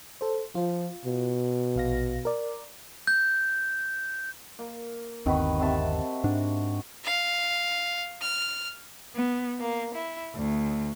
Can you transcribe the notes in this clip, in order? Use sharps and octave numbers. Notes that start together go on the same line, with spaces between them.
A4 C5
F3 F4
B2
A#1 F5 A#6
A#4 D5
G6
A#3
G1 D#2 D#3 C4 F#4 B4
C3 E5 A5
G#2 D4 F#4
F5
F6
B3
A#3
E4
D2